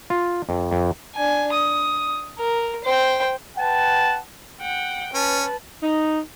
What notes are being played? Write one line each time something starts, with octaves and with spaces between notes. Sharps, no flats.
F4
F2
F2
D4 G#5
D#6
A#4
C5 G5
B4 F#5 G5 A5
F#5 G5
C#4 B4 A5
D#4